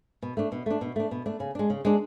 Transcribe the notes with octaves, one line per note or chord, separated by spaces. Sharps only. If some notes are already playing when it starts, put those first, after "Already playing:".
B2
A3 D4
B2
A3 D4
B2
A3 D4
B2
A3 D4
C#3
G#3 D4
C#3
G#3 D4